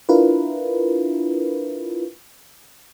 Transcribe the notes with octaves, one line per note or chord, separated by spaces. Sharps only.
D4 E4 F4 A#4 B4